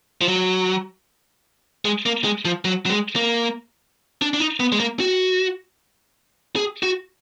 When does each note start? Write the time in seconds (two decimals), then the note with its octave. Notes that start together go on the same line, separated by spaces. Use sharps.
0.21 F3
0.28 F#3
1.85 G#3
2.06 A#3
2.24 G#3
2.45 F3
2.65 F#3
2.86 F#3
2.90 G#3
3.16 A#3
4.22 D4
4.34 D4
4.40 D#4
4.60 B3
4.72 G#3
4.80 A#3
5.00 F#4
6.56 G#4
6.83 F#4